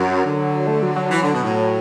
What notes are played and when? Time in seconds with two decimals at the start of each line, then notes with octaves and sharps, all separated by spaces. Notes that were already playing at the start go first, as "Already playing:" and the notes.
Already playing: F#2 F#3
0.24 D3
0.67 A3
0.82 F#3
0.96 F#3
1.11 E3
1.22 D3
1.33 B2
1.43 A2